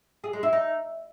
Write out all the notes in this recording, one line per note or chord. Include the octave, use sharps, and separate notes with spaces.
G#4
G#3
E4
D#4